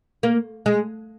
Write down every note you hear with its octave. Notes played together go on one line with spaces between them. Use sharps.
A#3
G#3